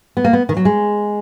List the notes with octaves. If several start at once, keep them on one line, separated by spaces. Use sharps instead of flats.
B3
A#3
B3
D#3
F#3
G#3